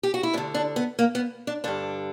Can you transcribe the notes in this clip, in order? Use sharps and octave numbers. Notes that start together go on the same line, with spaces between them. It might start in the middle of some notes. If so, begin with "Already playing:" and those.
G4
F#4
E4
D2 D3 D4
D4
B3
A#3
B3
D4
G2 D3 D4